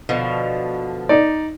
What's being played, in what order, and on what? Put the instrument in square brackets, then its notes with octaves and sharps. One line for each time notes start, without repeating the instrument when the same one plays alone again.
[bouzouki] B2 D3 F3
[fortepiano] D#4 D5